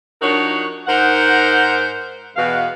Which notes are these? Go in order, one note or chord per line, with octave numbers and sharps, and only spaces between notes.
F3 D4 D#4 F#4 A#4 C#5
G#2 D#4 A#4 C5 F#5
E2 B2 F5